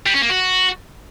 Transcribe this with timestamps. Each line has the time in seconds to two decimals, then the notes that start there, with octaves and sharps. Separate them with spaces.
0.06 G3
0.14 C#4
0.22 A#3
0.29 F#4